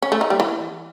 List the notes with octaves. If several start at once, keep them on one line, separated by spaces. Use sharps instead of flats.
C#4
A3
D#4
G3
E3